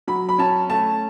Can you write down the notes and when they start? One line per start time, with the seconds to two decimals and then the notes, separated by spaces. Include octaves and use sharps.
0.08 F#3 B5
0.29 B5
0.38 C#4 A5
0.70 A3 A5